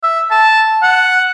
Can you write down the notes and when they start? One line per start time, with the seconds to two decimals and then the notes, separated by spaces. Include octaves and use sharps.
0.03 E5
0.31 A5
0.83 F#5